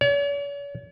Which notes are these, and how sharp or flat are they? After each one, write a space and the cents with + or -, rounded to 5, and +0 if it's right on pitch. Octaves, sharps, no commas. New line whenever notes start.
C#5 +45